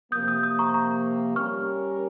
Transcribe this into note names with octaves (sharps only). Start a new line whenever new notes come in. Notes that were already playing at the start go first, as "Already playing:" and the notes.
C3 F3 A#3 D#6 G6
D#6 G6
D#6 G6
A#5 C#6
A#5 C#6
G3 C#4 G4 A#4 C#6 F6